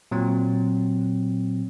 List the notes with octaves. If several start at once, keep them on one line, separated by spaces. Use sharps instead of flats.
A#2 F#3 C4